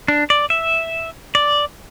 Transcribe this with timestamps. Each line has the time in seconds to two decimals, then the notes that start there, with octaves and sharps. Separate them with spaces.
0.08 D4
0.30 D5
0.50 E5
1.35 D5